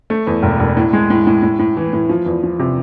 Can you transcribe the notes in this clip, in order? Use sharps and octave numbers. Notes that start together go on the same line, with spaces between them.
A3
E2
E1
E1
A2
G#3
A2
A2
A2
A2
E3
A2
F3
E2
F3
C3